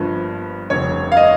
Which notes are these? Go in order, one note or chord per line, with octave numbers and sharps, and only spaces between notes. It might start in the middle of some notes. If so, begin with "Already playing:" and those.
Already playing: G1 G2 F3 A#3
F1 F2 C#3 C#5
F5
D#5